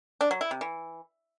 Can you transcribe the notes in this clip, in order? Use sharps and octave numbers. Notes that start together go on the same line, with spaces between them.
D4
F#3
E4
C3
E3